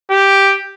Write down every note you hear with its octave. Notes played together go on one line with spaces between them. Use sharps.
G4